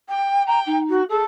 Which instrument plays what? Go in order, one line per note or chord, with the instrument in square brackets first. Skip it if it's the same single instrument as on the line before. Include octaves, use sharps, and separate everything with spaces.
[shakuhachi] G5
[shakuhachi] G5 [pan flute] A#5
[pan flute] D#4
[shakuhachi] F#4
[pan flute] G#4 [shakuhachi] A4